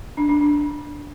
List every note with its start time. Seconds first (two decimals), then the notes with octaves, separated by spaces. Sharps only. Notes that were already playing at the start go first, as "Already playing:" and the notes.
0.17 D4
0.29 D4
0.41 D4